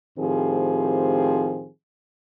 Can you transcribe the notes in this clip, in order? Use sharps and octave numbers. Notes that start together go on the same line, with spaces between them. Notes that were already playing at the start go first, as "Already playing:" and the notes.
A2 D#3 F3 C4 G4 G#4